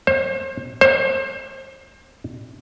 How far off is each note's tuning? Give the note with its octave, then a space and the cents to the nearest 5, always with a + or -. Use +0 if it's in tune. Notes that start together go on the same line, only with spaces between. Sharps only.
C5 +35
C5 +30